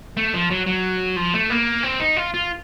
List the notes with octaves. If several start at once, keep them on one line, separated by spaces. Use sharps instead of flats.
A3
F3
F#3
F#3
F3
A3
A#3
C4
D#4
F4
F4